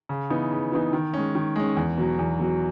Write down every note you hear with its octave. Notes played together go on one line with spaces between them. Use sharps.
C#3
E3 B3 D#4
C#3
E3 B3 D#4
D#3
G#3 C#4
D#3
G#3 C#4
E2
B2 F#3
E2
B2 F#3